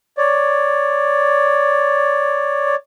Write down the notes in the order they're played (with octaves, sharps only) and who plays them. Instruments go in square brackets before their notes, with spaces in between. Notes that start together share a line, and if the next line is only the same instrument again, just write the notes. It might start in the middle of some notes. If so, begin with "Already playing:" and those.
[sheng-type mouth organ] C#5 D5